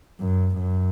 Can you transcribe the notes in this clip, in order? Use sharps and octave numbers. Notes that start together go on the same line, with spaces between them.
F#2
F#2